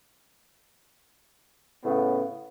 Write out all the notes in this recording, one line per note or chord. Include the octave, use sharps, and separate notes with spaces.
A2 C#3 B3